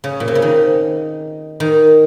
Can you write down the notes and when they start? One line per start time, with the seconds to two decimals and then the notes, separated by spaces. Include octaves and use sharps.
0.04 C#3
0.20 A#2
0.28 C3
0.35 C#3
0.42 D#3
1.60 D#3